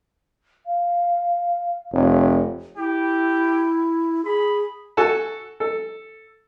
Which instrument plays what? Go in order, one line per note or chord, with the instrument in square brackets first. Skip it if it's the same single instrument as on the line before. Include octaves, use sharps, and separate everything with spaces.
[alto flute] F5
[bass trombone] F1 [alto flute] C#5
[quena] E4 [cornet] G4
[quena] G#4 [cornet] B5
[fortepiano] F#4 A4 G#5 A5
A4